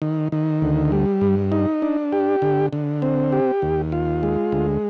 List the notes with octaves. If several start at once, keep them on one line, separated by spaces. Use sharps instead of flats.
D#3
D#3
D2
G3
G2
D#4
D4
G4
D3
D3
C4
G4
D#2
F4
G#3
D2